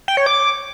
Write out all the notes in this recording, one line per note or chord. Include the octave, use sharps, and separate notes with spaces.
G5
C#5
D6